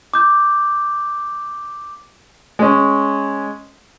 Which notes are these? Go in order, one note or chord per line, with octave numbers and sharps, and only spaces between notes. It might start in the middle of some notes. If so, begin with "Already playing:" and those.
D6 G6
G#3 C#4